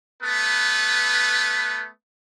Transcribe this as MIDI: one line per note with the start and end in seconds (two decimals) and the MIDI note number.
0.22 1.87 57
0.22 1.87 59
0.22 1.87 71